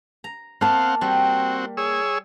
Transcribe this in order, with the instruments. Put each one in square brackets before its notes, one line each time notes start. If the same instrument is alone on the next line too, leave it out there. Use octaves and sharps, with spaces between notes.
[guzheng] A#5
[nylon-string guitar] A#3 A5 [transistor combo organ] C4 F5 F#5
[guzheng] G3 [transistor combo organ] C4 F#4
[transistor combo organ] G#4 C#5 E6